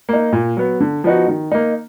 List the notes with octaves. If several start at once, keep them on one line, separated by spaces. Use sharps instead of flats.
A#3 D#4
A#2
F#3 B3
D3
F3 B3 D#4 F#4
D#3
A#3 D#4